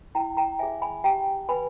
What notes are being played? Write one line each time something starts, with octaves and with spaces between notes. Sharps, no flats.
E4 G5 A#5
G5 A#5
G#4 C#5 E5 G#5
G#5 B5
G4 G5 A#5
B4 G#5 B5